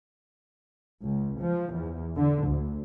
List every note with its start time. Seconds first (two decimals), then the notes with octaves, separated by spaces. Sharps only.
1.03 C#2
1.41 F3
1.75 E2
2.17 D3
2.49 D2